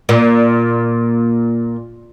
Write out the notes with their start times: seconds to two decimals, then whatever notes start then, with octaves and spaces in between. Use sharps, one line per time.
0.09 A#2